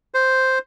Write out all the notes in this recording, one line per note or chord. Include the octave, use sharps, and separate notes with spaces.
C5